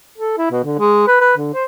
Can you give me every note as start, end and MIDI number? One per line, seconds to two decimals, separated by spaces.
0.18 0.36 69
0.38 0.46 64
0.51 0.62 47
0.64 0.77 50
0.79 1.06 56
1.07 1.16 71
1.20 1.33 71
1.37 1.52 50
1.53 1.65 72